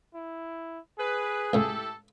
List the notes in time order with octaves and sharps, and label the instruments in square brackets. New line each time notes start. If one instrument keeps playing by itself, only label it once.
[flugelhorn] E4
[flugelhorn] G#4 [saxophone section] B4
[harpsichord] C#2 A2 [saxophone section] E4 G4 A4